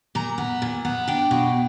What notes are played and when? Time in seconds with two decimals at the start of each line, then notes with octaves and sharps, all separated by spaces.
0.15 A#2 A#5
0.38 B3
0.62 A#2
0.85 B3
1.08 D4 G5
1.31 B2